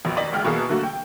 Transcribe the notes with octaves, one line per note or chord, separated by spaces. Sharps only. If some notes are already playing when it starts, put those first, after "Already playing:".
A1 F2 B2
D#2 D5 D#5 B6 F#7
A1 D2 G#3 G5 F6
B2 E3 A#3 G#4 A4
D3 F#3 A3 A#3 F#4
G5